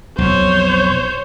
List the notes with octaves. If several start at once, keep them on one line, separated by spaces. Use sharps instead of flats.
B1 F2 C5 C#5